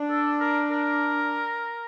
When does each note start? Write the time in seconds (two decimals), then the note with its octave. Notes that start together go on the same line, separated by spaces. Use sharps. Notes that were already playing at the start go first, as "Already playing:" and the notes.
Already playing: D4
0.10 A4
0.40 A#4
0.71 A#4